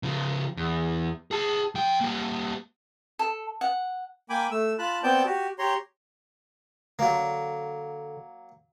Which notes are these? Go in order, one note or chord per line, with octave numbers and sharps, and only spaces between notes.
C#3 F3
E2
G#4 A5
F3 G5
G3 A#3
A4
F#5
A#3 G5 G#5 B5 D6
A3 E6
F4 A5 B5 F#6
B3 C4 D5 G5 A5 G6
F#4 G4
G4 C#5 A#5 C6
D3 F#3 A#3